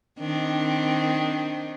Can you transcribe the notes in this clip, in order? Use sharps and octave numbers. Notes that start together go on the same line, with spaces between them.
D#3 C4 D4